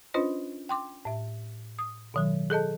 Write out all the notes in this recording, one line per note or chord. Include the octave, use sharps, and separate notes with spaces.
C#4 D4 F4 B4 C5 D#5
G5 C6 D6
A2 E5
D#6
B2 D#3 F#3
G#4 A4 D#5 A5